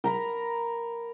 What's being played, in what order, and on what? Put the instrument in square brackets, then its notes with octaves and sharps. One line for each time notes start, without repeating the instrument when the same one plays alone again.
[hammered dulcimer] A#4 A#5 B5